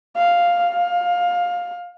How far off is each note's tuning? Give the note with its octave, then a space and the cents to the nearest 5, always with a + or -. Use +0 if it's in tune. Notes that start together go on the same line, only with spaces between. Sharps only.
F5 +0
F5 +20